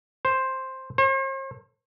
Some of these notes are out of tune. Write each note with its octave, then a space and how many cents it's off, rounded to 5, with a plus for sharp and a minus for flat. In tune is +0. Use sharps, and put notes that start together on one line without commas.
C5 +5
C5 +45